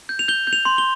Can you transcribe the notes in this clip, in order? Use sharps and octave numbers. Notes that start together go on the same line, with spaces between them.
G6
F7
G6 G7
G6
F7
C6
G7